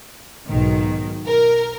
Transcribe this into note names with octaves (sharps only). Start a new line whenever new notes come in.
B1 G#2 D#3
A#4